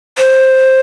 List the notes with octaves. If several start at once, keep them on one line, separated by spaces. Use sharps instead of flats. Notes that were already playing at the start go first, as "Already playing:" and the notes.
C5